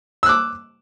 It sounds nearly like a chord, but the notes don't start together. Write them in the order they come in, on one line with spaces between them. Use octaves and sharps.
E6 F#6 D6